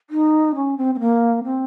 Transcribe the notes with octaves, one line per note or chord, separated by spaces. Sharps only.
D#4
C#4
C4
C4
A#3
C4